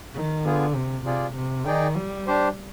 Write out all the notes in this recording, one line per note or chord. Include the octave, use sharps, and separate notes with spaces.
D#3
D3 B3 F4 G#4
C3
C3 F4 G#4 D5
C3
D#3 D#4 G#4 D5 G5
G3
D4 G4 C5